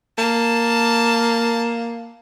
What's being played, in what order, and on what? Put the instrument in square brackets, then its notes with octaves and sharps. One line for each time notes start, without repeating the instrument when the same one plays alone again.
[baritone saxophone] A#3 [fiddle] A5